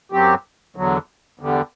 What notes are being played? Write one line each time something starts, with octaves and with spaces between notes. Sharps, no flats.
F#2 F#3 C4 G4
E2 D3 F#3
E2 D3 G3